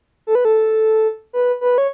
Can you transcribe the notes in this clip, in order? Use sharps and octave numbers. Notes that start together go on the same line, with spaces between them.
A4
B4
A4
B4
B4
C#5